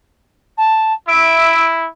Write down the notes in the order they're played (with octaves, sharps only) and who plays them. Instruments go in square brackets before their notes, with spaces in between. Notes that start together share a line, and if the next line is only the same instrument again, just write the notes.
[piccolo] A5
[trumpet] E4 [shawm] E5 [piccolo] D7